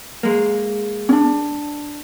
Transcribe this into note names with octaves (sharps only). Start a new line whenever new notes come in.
G#3 A#3
C#4 D4